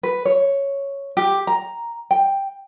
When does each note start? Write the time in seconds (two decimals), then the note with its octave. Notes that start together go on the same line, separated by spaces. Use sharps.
0.03 B4
0.25 C#5
1.17 G4
1.47 A#5
2.11 G5